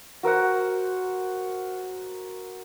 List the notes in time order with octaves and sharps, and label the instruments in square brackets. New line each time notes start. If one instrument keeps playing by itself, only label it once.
[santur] F#4 A#4 C5 F#5